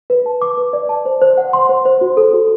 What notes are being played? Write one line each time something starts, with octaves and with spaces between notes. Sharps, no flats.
B4
A5
D6
B4
D5
A5
C5
C5
F#5
C6
C5
C5
F#4
A4
F#4